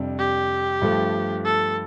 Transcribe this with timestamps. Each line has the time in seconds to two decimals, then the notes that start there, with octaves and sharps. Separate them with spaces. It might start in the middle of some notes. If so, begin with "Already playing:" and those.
Already playing: F2 C3 G3 D4
0.19 G4
0.82 G2 F3 A3
1.45 A4